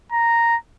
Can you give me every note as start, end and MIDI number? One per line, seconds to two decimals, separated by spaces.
0.13 0.56 82